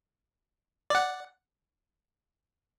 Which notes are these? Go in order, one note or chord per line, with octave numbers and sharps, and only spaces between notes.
D5 F#5